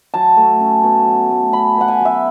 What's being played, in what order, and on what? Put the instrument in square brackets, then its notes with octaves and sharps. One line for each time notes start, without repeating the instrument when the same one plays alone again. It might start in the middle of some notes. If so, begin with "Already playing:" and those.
[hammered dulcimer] F#3 A5
A3
C#4
B2
F#3
A3
C#4 B5
B2 F#5
G#5
F#3
E5